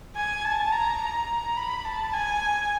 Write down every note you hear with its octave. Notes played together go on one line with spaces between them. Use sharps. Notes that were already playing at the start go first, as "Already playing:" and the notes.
G#5
A5
A#5
A#5
B5
A5
G#5